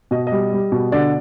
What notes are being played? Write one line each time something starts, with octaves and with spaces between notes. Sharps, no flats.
B2 D#5
G3 D#5
G3
B2
D3 D5